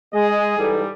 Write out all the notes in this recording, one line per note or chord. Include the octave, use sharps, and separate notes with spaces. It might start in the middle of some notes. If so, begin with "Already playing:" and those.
G#3 G#4 D#5
G#2 E3 G3 A4